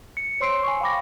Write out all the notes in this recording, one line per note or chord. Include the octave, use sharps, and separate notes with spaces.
C#7
C5 C#5 C6 E6 C7 D7
G#5 C#6
F5 G5 B5 D6 A#6